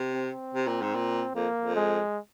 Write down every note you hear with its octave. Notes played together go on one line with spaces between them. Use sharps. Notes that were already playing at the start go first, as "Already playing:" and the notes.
Already playing: C3
C4
C3
A#2
G#2
A#2
F2 A#3
F2
G#3